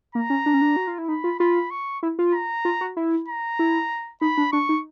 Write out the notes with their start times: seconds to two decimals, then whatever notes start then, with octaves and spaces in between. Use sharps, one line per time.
0.15 A#3 A#5
0.30 C#4
0.46 D4
0.54 C#4
0.61 D4
0.76 F#4
0.87 F4
0.98 E4
1.08 D#4 B5
1.24 F4
1.40 F4 B5
1.71 C#6
2.03 E4
2.19 F4
2.34 A#5
2.65 F4
2.81 F#4
2.97 E4
3.28 A#5
3.59 E4
4.21 D#4 B5
4.37 D4
4.52 D4 C#6
4.69 D#4